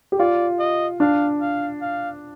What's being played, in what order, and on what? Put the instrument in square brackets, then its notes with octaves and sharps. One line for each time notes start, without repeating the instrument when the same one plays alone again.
[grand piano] G4
[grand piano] F4 [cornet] D5
[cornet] D#5
[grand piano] D4 [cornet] F5
[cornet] F5
F5